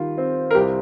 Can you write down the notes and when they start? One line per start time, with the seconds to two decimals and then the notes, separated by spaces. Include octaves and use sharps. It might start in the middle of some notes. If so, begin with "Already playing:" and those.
Already playing: D#3 G3 F4
0.18 C4
0.51 A#4
0.55 C2 G4